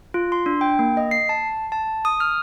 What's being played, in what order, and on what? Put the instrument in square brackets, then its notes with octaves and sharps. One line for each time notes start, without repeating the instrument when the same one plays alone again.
[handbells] F4
C6
D4
G5
A#3
D#5
C7
A5
A5
D#6
F6